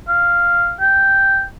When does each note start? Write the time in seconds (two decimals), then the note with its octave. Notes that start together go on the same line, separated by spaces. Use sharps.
0.09 F5
0.80 G5